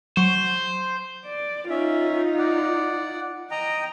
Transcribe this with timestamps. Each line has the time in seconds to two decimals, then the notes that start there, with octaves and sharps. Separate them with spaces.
0.17 F#3 C5
1.26 D5
1.70 C#4 D#4 F4 E5
2.38 D5 F#5
3.51 D#5 G5 A#5